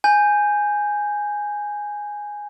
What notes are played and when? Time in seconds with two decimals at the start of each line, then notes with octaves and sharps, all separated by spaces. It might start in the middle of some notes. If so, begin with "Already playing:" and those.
0.04 G#5 G6